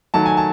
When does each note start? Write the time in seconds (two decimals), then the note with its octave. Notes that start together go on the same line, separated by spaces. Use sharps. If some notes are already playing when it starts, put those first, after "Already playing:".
0.14 D#3 F#3 A3 A5
0.26 G#5
0.37 A5